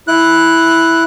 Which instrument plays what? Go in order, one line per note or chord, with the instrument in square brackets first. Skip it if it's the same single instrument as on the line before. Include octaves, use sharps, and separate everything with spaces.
[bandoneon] E4 F#6